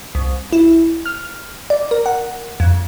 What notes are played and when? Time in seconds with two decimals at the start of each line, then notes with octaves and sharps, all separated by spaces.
0.15 C2
0.53 E4
1.06 F6
1.70 D5
1.91 A#4
2.06 F#5
2.60 F2